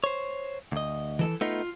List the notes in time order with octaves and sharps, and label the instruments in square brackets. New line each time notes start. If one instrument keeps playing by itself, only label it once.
[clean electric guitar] C5 C#5
D2 D#5
[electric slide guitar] E3 A4
[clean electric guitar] A3 B3 D#4 [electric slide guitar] F4